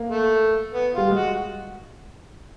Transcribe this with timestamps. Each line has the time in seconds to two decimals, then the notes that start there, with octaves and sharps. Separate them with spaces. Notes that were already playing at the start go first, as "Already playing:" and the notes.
Already playing: A#3
0.09 A3
0.73 B3
0.95 G3 F4
1.11 G#3
1.16 F#4